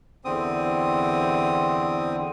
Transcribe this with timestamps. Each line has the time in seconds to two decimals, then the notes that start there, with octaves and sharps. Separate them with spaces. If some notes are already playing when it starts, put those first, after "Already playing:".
0.25 E2 D3 C4 D#6